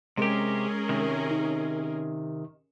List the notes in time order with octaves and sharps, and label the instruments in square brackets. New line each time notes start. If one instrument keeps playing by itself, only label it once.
[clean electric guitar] C3 G4 [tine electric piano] G#3 [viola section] C#4 G#4 A#4
[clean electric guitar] C3 D#3
[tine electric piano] D#4